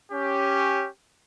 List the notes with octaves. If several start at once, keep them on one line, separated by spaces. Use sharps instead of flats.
C#4 G4